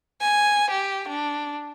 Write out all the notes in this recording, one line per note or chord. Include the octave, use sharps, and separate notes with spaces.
G#5
G4
D4